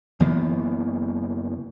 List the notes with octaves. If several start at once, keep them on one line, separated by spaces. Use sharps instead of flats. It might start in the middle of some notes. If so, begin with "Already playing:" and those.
F#1 E3 A#3 B3